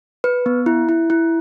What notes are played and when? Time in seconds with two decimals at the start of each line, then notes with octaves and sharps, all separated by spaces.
0.24 B4
0.46 B3
0.66 E4
0.89 E4
1.10 E4